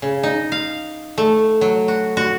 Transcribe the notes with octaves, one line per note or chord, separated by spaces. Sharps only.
C#3
D#4
F5
A3
F#3
F#4
F#4